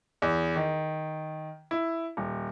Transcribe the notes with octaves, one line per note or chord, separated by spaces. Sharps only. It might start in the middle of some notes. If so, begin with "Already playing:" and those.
E2
D#3
E4
D#1